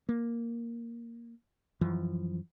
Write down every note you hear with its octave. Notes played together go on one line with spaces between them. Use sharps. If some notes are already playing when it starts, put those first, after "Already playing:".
A#3
F#2 E3 F3